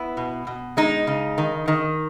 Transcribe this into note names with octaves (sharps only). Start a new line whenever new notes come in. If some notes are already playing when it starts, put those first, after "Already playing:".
Already playing: B3 E4
B2
B2
G#3 D#4
C#3
D#3
D#3